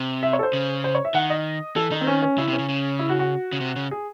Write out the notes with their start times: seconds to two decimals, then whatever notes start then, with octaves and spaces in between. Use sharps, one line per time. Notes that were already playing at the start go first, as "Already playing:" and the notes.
Already playing: C3
0.23 E5
0.33 C#5
0.39 A4
0.43 C5
0.53 C#3
0.84 C5
0.95 C#5
1.05 E5
1.14 D#3 F#5
1.30 D#5
1.76 E3 A4
1.91 D#3 D#4
2.01 C4
2.07 C#4
2.22 C#4
2.38 C#3 E4
2.48 C3
2.53 C#4
2.59 C#3
2.69 C#3
2.99 E4
3.09 F#4
3.19 F#4
3.53 C#3
3.60 C3
3.76 C#3
3.91 G#4